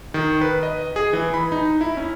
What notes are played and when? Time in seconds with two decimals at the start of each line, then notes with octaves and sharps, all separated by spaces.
0.14 D#3
0.41 B4
0.63 D#5
0.96 G#4
1.13 E3
1.34 B5
1.52 D#4
1.81 E4
1.97 C#4